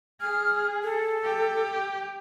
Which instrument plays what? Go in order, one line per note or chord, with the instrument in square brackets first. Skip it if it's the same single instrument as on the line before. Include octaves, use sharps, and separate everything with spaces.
[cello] G#4 [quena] F6
[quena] A4
[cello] G4